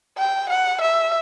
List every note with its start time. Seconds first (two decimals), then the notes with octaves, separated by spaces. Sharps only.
0.17 G5
0.49 F#5
0.81 E5